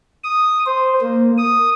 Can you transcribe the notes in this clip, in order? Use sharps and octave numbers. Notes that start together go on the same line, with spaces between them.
D#6
C5
A#3
D#6